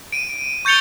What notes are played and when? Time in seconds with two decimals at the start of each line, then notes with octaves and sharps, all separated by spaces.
0.12 D7 D#7
0.65 C#6 G6 A6 C#7 F7 G7